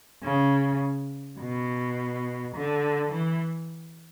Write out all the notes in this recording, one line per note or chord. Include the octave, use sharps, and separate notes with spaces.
C#3
B2
D3
E3